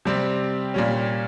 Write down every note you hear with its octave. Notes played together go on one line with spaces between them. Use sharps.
C3 G3 C4
A#2 G3 C#4